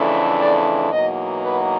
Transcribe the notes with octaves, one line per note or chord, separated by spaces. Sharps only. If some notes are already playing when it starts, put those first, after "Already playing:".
Already playing: F2 C#3 E3 A3 D4
D5
E2 B2 F#3 A#3 D#4 D#5
B4